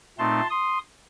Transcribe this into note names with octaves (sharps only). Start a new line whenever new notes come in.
A#2 A3 C4 D#4 A5 C6
C6 D#6